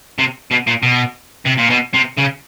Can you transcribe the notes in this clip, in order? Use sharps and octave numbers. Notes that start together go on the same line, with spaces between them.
C3
B2
A#2
B2
C3
A#2
B2
C3
C#3